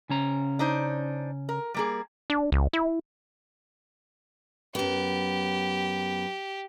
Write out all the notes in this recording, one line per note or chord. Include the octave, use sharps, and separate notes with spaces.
C#3 C#4 A#5
D4 D#4 C5
A#4
G3 A#3 G#4
D4
C#2
E4
F#2 B3 G4